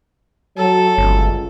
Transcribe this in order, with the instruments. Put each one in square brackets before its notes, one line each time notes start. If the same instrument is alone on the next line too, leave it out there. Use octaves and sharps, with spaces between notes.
[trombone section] F#3 [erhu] A4
[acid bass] G1 [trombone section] C#2